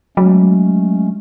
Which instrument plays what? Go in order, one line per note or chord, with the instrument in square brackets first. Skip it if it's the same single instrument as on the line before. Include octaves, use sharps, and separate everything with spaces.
[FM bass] F#3 [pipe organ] G#3 A3 C#4